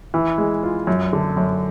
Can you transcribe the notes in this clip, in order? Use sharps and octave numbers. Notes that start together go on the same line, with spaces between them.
E3
G#3
F4
F#2
D3
F#2